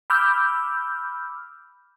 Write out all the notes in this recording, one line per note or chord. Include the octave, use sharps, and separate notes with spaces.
B5 D6 E6 F6 G6